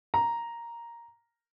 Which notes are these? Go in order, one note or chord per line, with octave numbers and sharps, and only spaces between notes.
A#5